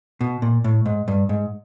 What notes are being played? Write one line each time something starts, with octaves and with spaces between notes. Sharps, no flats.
B2
A#2
A2
G#2
G2
G#2